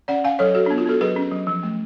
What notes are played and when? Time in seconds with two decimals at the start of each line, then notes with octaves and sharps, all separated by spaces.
0.08 C#4 D5 F#5
0.24 C#4 F5 G#5
0.39 F#3 A4 C#5
0.54 F#3 F#4 A4
0.66 B3 D4
0.78 F4
0.86 B3 F#4 A4
1.01 F#3 G#4 B4
1.16 C#4
1.32 F#3
1.47 F3
1.63 A3